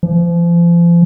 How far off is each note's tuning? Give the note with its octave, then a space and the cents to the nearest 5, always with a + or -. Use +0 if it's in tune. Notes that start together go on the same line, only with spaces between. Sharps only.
F3 -35